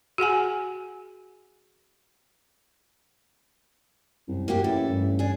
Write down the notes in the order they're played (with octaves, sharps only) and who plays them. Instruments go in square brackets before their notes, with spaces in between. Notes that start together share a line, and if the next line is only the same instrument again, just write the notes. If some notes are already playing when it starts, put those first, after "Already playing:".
[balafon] F#4 G#4 F#5 G#5
[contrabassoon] C2 [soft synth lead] F#2
[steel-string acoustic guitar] A#3 F#4 G4
[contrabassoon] A1 [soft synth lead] E4 [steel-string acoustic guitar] A4
[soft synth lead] G2
[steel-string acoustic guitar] D4 G#4